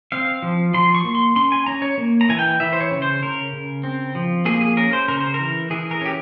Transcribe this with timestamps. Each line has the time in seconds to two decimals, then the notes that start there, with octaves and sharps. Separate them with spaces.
0.12 C4 F5
0.42 F3
0.74 F3 C6
0.95 C#6
1.05 A#3
1.15 C6
1.36 C#4 C6
1.52 G#5
1.66 C#4 A#5
1.82 C#5
1.98 A#3
2.21 A#5
2.29 E3 G#5
2.39 G5
2.60 E3 E5
2.73 C5
2.81 C#5
2.91 C#3
3.02 C5
3.23 C#3 A#4
3.53 C#3
3.83 C4
4.15 F3
4.45 A#3 G#4
4.61 G#4
4.77 C#4 A#4
4.93 C5
5.08 C#3 A#4
5.21 C5
5.34 E3 A#4
5.70 E3 G#4
5.91 A#4
6.01 C#4 G4